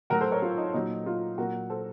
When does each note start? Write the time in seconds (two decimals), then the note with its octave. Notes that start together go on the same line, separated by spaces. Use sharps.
0.10 A2 F#3 F#4 A#4
0.21 A4 C5
0.32 A#4 C#5
0.42 F4
0.58 D#4
0.74 A#2 F#3 D#4
1.06 F4
1.38 A#2 F#3 F#4 A#4
1.70 A4 C5